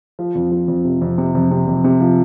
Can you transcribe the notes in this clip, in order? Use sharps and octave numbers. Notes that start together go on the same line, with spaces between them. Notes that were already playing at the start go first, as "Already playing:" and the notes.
F3
F2
F3
F2
C3
F2
C3
F2
C3
F2
C3
F3